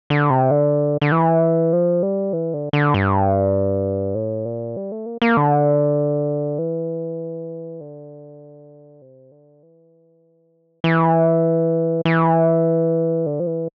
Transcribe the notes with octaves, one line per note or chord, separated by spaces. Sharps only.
D3
C3
D3
D3
E3
F3
G3
E3
D3
D3
G2
A2
A#2
G3
A3
A#3
A#3
D3
E3
D3
C3
D3
E3
E3
E3
D3
F3
E3